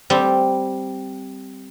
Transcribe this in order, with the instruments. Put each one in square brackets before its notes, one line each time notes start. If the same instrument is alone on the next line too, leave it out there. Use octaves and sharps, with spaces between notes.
[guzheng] G3 C4